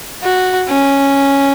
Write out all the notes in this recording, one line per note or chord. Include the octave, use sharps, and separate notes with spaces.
F#4
C#4